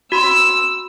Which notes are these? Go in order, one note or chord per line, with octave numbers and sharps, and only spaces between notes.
F#4 B5 C6 E6